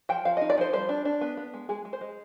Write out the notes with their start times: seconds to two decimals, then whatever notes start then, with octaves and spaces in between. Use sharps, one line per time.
0.09 F3 G5
0.25 F3 F5
0.37 D#5
0.41 D#4
0.50 D5
0.58 F3 C5
0.73 G3 C5
0.89 D4
1.05 D4
1.21 B3
1.37 B3
1.54 G#3
1.69 G#3 G#4
1.85 G#3
1.93 C5
2.01 G#3